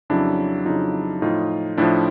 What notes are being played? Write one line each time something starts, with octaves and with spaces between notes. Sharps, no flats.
F2 C#3 F#3 D4 E4
F2 C#3 F#3 D#4 F4
A2 F3 D#4 F4
A2 F3 D4 E4